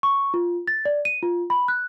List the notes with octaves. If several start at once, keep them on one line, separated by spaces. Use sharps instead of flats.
C#6
F4
A6
D5
D#7
F4
B5
F#6